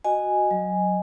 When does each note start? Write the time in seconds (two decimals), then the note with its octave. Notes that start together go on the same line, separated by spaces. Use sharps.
0.04 F#4 D#5 G#5
0.51 F#3